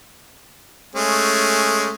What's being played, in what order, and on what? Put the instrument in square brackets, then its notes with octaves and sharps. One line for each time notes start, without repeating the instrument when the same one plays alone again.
[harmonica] G#3 A3 C#4